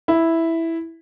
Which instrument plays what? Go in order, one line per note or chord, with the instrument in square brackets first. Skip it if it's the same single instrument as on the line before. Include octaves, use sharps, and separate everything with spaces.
[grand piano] E4